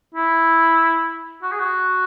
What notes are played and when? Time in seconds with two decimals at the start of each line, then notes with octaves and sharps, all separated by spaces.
0.14 E4
1.42 F#4
1.51 G#4
1.59 F#4